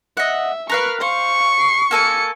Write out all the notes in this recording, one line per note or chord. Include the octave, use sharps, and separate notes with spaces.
D#5 E5 F#5
A#4 B4 F5 C#6 F6
C5 F5 C#6
C7
A#3 A4 G#5 C#7